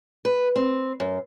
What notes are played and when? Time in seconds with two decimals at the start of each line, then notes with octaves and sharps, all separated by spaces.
0.25 B4
0.56 C4
1.00 F#2